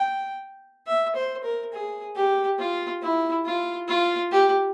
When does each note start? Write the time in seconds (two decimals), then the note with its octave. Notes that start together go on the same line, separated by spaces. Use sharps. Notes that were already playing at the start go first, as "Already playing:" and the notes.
Already playing: G5
0.87 E5
1.16 C5
1.44 A#4
1.73 G#4
2.16 G4
2.59 F4
3.02 E4
3.45 F4
3.88 F4
4.31 G4